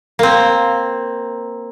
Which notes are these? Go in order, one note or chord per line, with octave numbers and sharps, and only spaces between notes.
A#3 C4